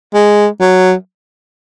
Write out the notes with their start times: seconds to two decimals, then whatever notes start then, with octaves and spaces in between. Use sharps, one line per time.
0.14 G#3
0.60 F#3